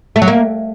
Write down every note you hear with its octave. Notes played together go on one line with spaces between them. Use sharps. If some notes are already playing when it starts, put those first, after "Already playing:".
A3
F#3
A#3